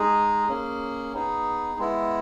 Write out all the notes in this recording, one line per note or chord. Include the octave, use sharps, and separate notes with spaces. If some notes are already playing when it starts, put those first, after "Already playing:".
Already playing: G#3 D#4 G#4
A#3 C#4 G#4
B3 D#4 G#4
G#3 B3 E4